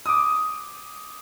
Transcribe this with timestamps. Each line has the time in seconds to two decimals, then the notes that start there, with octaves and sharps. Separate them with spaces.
0.06 D6 D#6